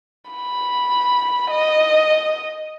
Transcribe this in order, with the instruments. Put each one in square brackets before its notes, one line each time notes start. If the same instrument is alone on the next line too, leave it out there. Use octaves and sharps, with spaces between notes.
[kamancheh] B5
D#5